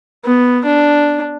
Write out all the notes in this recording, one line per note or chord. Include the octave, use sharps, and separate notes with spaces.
B3
D4